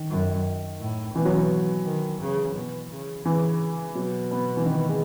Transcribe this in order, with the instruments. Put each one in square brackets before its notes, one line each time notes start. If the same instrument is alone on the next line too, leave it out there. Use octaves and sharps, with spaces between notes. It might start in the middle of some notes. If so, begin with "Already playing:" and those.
Already playing: [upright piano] D#3
[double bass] F#2
A2
[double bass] B2 [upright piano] E3
[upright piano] F#3
E3
[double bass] D#3
C#3
B2
C#3
[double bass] C#3 [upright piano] E3
[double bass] B2 [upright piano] F#3
[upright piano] B3
E3
D#3
G#3